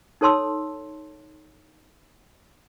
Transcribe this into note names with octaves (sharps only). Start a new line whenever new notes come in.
D#4 A4 C#5 A5 C6 E6